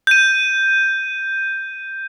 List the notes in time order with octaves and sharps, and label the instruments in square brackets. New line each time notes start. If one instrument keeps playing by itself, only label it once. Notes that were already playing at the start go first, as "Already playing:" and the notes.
[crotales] G6 D#7